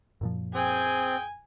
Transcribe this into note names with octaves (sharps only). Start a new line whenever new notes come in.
F#2 A#2 F3
C4 G#4 G5 G#5